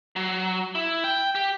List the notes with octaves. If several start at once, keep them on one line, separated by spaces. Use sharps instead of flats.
F#3
E4
G5
G4